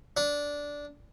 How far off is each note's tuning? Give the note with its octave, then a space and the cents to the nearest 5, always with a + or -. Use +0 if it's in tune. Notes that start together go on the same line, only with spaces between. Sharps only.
D4 -10